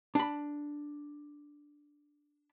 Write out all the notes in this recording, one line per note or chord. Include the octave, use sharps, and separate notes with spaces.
D4 B5